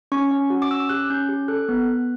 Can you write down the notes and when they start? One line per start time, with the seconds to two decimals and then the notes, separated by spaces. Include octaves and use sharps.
0.12 C#4 C#6
0.31 C#4
0.50 F#4
0.62 D6
0.71 C#4 E6
0.89 G4 F#6
1.10 C#4 G6
1.29 G4
1.48 A4 F#6
1.69 B3
1.88 B3